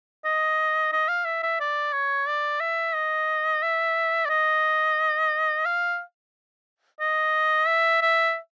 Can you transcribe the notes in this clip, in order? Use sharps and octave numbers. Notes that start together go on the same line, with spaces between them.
D#5
D#5
F5
E5
E5
D5
C#5
D5
E5
D#5
E5
D5
D#5
F5
D#5
E5
E5